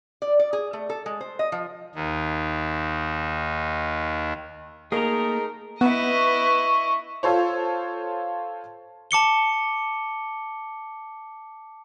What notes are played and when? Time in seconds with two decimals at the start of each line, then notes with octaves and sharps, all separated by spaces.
0.22 D5
0.39 D5
0.53 G#4
0.73 A3
0.90 A4
1.06 G#3
1.21 C5
1.39 D#5
1.52 F3
1.95 D#2 D#3
4.92 A3 A#3 D#4 G#4 A#4 A#5
5.81 B3 E4 B4 D#5 C#6
7.23 F4 A4 C5 C#5
9.11 A5 D6 C#7 G7